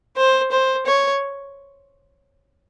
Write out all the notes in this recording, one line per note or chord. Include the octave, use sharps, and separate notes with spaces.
C5
C5
C#5